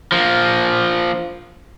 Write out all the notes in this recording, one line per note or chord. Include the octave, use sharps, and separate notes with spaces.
F3 A#3